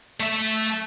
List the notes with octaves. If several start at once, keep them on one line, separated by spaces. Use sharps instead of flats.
A3 E5